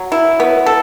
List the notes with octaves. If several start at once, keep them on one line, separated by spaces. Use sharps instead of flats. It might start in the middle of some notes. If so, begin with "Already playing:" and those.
Already playing: F#3
E4
B3
A4